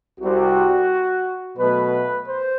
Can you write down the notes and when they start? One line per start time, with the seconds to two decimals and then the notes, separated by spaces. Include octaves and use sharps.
0.20 C2 C3 G3 C4 F#4
1.57 B2 F#3 A3 B4
2.26 C5